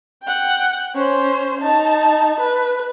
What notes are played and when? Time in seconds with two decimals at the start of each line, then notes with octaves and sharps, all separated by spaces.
0.23 F#5 G5
0.95 C#4 C5
1.61 D#4 A5
2.40 B4